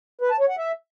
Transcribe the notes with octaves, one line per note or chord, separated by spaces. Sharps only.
B4
A5
C#5
F#5
E5